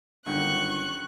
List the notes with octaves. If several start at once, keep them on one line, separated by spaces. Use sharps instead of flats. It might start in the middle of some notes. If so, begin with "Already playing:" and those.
G1 F#2 D3 D#3 C#6 F#6